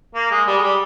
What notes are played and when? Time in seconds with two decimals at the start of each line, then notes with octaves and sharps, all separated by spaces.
0.15 A#3
0.31 G#3
0.47 G3
0.57 G#3
0.63 G3